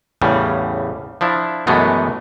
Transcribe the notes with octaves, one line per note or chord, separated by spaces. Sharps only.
E2 A2 C#3 G3
F3 D4 E4
F#2 B2 E3 G#3 A3 B3